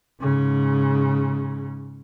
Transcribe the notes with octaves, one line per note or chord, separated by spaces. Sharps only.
G#2 C#3